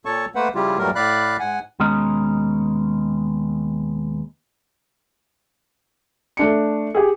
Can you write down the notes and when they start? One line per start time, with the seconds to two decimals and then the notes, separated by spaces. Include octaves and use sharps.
0.05 A#2 A4 C#5 A5 C#6
0.35 A3 A#3 B4 C5 F#5
0.55 C#3 F3 G3 E4 F4 G4
0.78 G2 A#2 F#3 G3 A3 A#4
0.95 A2 D5 F5 B5 F#6
1.39 G#2 F#5 G#5
1.80 D#2 B2 G#3 C#4 D#5 A#5
6.37 A3 D4 C#7
6.95 G4 G#4